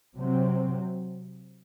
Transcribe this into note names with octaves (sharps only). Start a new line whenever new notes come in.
C3 F#3 C4